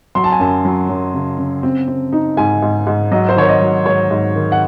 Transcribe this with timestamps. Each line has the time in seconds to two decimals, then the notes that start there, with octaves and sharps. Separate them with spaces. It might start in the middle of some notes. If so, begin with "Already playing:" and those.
0.15 F#3 C6
0.24 A5
0.32 G#5
0.40 F#2 A5
0.65 F#3
0.89 F#2
1.14 C#3
1.38 C#3
1.63 C4
1.88 C4
2.13 D#4
2.37 G#2 G#5
2.62 G#2
2.87 G#2
3.11 F#3 D#5
3.29 C5
3.36 D#3 C#5
3.49 D#5
3.61 F#3
3.86 G#2 C#5
4.11 G#2
4.35 D#3
4.52 F#5